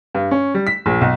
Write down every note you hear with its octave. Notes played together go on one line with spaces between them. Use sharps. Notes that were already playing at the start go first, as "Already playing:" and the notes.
G2
C#4
G3
B6
A#1
B1